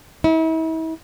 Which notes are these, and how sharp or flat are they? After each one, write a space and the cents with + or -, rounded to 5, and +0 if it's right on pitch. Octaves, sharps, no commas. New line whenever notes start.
E4 -40